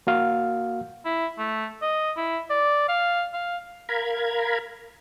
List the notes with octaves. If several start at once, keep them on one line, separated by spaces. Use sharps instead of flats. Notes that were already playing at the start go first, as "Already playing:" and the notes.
A#3 F#4 F5
E4
A3
D#5
E4
D5
F5
F5
A#4 F5 A#5 B5 G#6